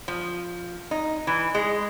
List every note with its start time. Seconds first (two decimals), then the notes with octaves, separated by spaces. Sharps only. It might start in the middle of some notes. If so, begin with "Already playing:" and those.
0.08 F3
0.91 D#4
1.27 E3
1.55 G#3